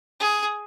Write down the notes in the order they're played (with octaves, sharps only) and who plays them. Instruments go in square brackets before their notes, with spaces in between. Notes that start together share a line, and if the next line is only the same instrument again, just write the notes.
[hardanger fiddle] G#4